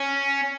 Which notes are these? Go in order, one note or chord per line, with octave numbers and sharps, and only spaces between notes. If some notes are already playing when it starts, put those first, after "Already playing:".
Already playing: C#4